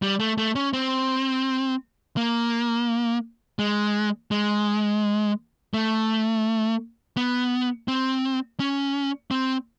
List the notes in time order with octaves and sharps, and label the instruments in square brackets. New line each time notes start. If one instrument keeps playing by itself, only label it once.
[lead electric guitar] G3
A3
A3
C#4
C4
A#3
G#3
G#3
A3
B3
C4
C#4
C4